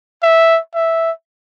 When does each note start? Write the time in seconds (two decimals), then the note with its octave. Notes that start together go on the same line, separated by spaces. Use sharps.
0.23 E5
0.75 E5